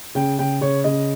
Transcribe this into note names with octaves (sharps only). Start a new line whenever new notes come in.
C#3 G5
C#3 G5
C#3 C#5
C#3 D#5